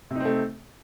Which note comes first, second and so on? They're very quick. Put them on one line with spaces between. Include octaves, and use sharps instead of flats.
C3 D#4 C4 A3